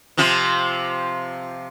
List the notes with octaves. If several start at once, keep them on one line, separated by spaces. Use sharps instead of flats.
C3 F3 F4